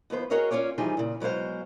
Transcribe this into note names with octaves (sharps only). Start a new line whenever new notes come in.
D#2 F3 B3 C5
F#4 G#4 A#4 C#5 D#5 F5
C#4 D4 F4 C#5 D5
E3 F3 G3 D#4 G#4
A#2 C#3
B2 F#3 G#3 C5 F5